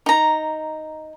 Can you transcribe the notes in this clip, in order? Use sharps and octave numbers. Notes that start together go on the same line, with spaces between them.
D#4 A#5